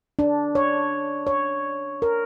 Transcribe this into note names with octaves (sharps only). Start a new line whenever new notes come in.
D4
C#5
C#5
A#4